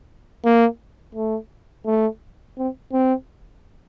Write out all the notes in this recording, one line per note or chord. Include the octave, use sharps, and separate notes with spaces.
A#3
A3
A3
C4
C4